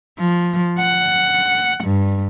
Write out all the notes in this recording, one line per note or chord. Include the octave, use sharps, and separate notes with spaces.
F3
F#5
G2